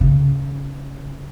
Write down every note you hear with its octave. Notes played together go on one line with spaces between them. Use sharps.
C#3